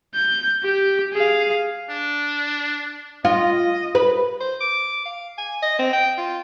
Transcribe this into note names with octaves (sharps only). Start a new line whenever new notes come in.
G6
G4
G#4 F5
D4
F4 D#5
B4
C5
D6
F5
G#5
D#5
C4
G5
F4